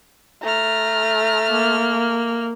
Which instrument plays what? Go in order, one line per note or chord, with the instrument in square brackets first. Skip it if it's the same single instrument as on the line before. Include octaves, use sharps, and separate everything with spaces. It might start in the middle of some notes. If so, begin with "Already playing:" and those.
[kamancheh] A3 F6 [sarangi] A#5
[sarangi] A#3